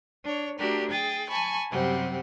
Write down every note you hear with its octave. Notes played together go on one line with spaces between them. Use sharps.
D4 C#5
A3 D4 F#4 G4 A#4
G#4 G5 A6
G#5 A5 B5 C#6
F#2 C3 G3 C4 F#5